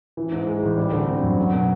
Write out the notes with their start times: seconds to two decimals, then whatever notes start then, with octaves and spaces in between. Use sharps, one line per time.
0.17 E3
0.32 G#2
0.47 G#3
0.62 A1
0.77 G3
0.92 D3
1.07 C4
1.23 F#2
1.37 F#3
1.53 B2